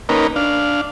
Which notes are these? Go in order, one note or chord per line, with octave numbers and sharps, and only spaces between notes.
A#3 C#4 D#4 A#4 B4
D4 F5